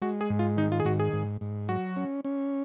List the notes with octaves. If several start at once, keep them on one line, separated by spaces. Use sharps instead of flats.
G#3 F#4
G#4
G#2
F4
D#3 D#4
F4
G#4
G#2 F#4
G#4
G#2
G#2
F#3 F#4
C#4
C#4